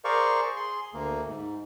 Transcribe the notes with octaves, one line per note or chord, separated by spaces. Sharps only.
G#4 A#4 C5 D5 F5 C#6
G#4 C6
D2 A#3
G#2